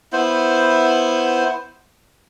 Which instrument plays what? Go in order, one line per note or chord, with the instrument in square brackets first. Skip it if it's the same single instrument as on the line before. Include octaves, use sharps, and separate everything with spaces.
[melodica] B3 E4 C5